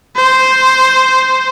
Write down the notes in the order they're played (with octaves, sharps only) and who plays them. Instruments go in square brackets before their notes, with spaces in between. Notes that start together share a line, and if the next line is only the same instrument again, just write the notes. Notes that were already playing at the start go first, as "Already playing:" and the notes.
[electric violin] C5